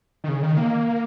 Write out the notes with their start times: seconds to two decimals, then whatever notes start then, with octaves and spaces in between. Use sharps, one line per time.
0.24 D#3
0.28 C#3
0.43 D#3
0.57 A#3